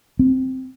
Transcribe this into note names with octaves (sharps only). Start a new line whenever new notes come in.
C4